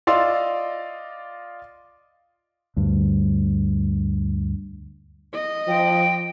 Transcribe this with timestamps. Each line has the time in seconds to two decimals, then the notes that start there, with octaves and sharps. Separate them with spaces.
0.07 F4 D5 D#5 F5 C6 E6
2.77 D2 G2
5.33 D#5
5.68 F3 G5